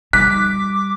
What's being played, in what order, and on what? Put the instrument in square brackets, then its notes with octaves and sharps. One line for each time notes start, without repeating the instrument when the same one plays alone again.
[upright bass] G3 [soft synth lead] D6 [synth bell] F#6 [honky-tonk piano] B6